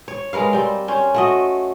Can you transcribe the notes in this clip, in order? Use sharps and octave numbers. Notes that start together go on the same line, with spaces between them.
C#5
G#3 A#4 B4 F5
G3 C4
C#4 C5
A3 F#4 D#5